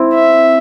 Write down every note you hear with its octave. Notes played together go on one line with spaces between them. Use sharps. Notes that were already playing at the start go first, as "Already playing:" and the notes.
Already playing: C4 E4
E5